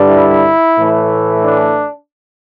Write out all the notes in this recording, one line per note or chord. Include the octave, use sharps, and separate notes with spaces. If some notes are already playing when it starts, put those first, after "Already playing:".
Already playing: G2 D3 G3
E4
A2 E3 A3
D4